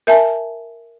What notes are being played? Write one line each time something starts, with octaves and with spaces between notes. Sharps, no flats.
A#4 E5 G#5 A5